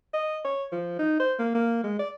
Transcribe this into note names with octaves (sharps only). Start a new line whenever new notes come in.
D#5
C#5
F3
D#4
C5
A#3
A#3
G#3
D5